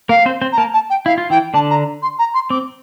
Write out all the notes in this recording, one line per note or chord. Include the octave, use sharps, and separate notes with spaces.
A#3 A#4 F5
C4 C5
C4 C5
A#5
A#3 A#4 A5
A5
G5
E4 F5
F4
E3 E4 G5
D3 D4 A5
A#5
C6
A#5
C6
C4 D6